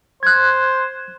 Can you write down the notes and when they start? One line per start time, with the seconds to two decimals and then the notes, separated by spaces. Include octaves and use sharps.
0.23 C5 F#6 G#6